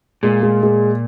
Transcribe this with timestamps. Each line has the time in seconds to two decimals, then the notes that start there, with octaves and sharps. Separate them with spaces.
0.23 A#2 G#3
0.43 G#3
0.63 G#3